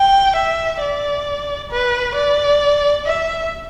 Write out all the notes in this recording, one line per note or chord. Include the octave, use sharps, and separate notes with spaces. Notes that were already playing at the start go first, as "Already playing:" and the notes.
Already playing: G5
E5
D5
B4
D5
E5